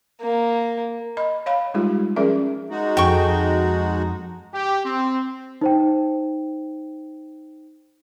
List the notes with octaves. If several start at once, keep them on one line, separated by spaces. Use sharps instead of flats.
A#3
D#5 B5
C#5 F5 B5
G3 G#3 D#4 F4 G4
F3 C#4 G#4 A#4 D5 E5
G#3 D#4 F#4
F2 G5 C#6
G4
C4
D#4 C5 G5